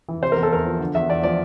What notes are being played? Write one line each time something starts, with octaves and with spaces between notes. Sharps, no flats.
E3
C3 C5
E2 A#4
A4
E2 A#4
F3
D3
E2 E5
E2 D5
F3 D5